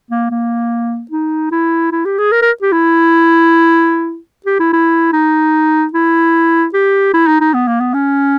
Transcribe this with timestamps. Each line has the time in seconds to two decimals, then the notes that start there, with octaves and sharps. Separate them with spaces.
0.10 A#3
0.31 A#3
1.11 D#4
1.51 E4
1.91 E4
2.05 G4
2.18 G#4
2.32 A#4
2.42 A#4
2.62 G4
2.72 E4
4.46 G4
4.59 E4
4.73 E4
5.13 D#4
5.93 E4
6.73 G4
7.14 E4
7.27 D#4
7.40 D#4
7.54 B3
7.67 A#3
7.80 B3
7.94 C#4